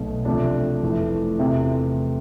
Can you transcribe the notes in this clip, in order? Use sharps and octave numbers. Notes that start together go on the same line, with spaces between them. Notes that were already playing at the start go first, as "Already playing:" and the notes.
Already playing: B1 B2 A3
D2 C3 F3 A3 D4
F1 F2 E3 A3
E2 C3 F3 A3 C4